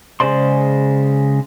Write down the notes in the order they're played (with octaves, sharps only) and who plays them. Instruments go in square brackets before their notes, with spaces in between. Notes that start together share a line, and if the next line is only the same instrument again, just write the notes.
[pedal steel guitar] C#3 G#3 C5 D5 C6